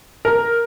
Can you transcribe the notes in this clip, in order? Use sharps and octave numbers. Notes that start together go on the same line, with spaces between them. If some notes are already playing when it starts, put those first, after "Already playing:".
A#4